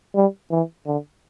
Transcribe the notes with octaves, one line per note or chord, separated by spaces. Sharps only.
G3
E3
D3